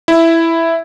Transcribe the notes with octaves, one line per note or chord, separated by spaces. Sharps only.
E4